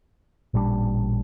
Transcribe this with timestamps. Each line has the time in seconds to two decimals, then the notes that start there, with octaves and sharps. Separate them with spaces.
0.54 A1 A#2 G3 D4